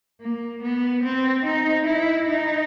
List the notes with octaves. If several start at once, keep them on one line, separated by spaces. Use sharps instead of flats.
A#3
B3
C4
D#4
E4
D#4